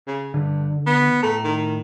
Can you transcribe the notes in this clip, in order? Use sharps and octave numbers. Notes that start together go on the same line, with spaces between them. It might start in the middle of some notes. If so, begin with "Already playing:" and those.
C#3
G2 D3
B3
A2 A3 A#5
D#3